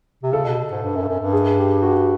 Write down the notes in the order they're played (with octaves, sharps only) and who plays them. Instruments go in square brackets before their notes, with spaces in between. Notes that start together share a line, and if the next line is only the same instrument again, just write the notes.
[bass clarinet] C3
[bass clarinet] C#3 [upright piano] A4
[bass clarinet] B2
G#2
G2
F#2
G2
F#2
G2
[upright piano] G#4
G4
F#4